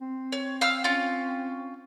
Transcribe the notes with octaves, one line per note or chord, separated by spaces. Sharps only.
C4
C#5
F5 E6 F6
C#4 F4